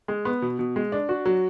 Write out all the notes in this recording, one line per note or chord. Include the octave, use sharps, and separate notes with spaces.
G#3
B3
B2
B2
G#3
D4
F#4
F#3